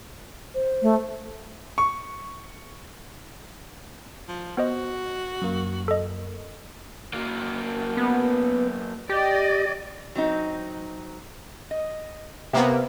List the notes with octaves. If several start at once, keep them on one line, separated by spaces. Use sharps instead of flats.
C5
A3
C#6
F3
B3 F#4 C5 D#5
F#2 A#3
A4 D#5
F#3 A#3
B3
G4 D5 D#5
F#3 C4 D#4
D#5
C3 A#3 B3 E5